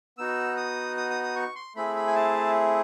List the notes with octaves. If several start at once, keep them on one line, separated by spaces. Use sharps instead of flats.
B3 D#4 F#4 E6
D#6
D#6
D#6
D#6
C#6
C6
A3 C4 E4 G#4 B5
B5
G#5
A5